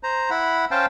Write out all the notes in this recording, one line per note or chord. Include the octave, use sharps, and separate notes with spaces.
C5 A#5
E4 F#5 B5
C#4 C5 F5 G5 A5